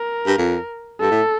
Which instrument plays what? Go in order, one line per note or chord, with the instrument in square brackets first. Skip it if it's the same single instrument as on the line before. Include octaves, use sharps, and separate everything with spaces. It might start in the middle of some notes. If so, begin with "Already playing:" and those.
Already playing: [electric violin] A#4
[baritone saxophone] G2
F2
[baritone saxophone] G2 [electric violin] A4
[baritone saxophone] A2